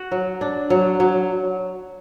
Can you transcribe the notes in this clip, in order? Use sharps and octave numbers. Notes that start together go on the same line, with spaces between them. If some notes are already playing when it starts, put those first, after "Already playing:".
Already playing: F#4
F#3
D4
F#3
F#3